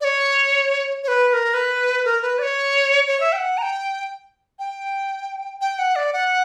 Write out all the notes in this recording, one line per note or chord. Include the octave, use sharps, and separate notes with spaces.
D5
C#5
C#5
B4
B4
A#4
B4
A#4
B4
D5
C#5
C#5
E5
G5
F#5
A#5
G5
G5
G5
F#5
D5
F#5